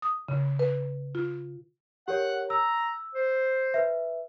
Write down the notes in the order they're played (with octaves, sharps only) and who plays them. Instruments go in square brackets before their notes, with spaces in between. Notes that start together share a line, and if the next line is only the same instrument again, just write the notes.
[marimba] D#6
C#3
B4
F4
[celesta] G4 A#4 C#5 [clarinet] F#5
[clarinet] A#5 [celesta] E6
[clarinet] C5
[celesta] B4 E5